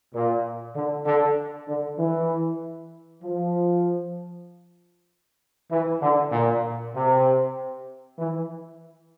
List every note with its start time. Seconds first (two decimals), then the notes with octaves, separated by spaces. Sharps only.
0.13 A#2
0.75 D3
1.06 D3
1.67 D3
1.99 E3
3.23 F3
5.71 E3
6.02 D3
6.32 A#2
6.94 C3
8.18 E3